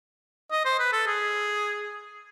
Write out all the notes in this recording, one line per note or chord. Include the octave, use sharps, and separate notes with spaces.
D#5
C5
B4
A4
G#4